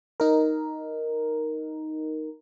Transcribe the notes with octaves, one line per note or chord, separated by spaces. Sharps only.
D#4 A#4